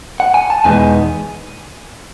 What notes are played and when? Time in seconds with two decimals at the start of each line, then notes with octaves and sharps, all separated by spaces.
0.20 F#5
0.34 G#5
0.50 A5
0.64 E2 B2 G#3 B3 D#4 G#5